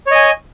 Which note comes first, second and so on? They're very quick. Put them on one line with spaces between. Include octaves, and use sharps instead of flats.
C#5 D#5 G#5